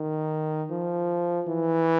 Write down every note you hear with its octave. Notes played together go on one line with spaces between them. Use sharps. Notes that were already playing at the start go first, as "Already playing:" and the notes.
Already playing: D#3
F3
E3